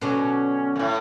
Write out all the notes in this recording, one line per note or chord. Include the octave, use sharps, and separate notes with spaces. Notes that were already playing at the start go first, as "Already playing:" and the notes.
B2 D3 F#3 C#4
F#2 A2